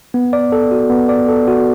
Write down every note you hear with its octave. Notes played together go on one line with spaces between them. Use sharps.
B3
D5
A4
F#4
B3
D5
A4
F#4